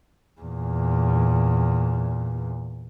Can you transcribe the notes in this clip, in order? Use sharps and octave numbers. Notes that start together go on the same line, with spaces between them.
E2 A#2